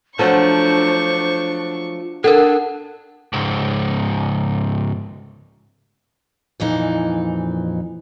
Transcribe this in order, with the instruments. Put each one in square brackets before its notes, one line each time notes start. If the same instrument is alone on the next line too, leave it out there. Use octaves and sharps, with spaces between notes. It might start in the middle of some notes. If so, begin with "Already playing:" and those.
[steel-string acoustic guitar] F3 F#3 A3 [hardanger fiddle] D4 C#6 [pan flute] C5
[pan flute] D4 [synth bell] A4 A#4 [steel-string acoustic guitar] F#5
[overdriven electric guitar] C#2 G#2
[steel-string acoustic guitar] F2 A#2 E3 D#4